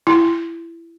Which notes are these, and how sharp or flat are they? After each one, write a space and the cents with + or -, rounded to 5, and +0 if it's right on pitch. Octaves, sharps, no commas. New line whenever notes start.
E4 +20